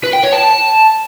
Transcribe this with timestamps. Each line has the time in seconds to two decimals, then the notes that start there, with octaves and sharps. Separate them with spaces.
0.03 B4
0.13 G5
0.23 C#5
0.33 A5